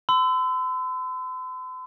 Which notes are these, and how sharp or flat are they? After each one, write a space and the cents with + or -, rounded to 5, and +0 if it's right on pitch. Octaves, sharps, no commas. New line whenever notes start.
C6 -45 E6 +0